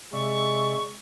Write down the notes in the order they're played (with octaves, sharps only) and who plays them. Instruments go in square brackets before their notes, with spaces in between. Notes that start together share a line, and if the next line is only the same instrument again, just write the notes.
[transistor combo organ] C3 D5 E5 [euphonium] G#3 [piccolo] C#6